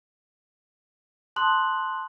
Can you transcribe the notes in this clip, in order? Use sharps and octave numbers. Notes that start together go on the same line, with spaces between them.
A5 C6 D#6 F#6 F#7